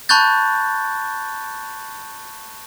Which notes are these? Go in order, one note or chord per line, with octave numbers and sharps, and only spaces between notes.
A5 B5 C#6 F#6 G6 A6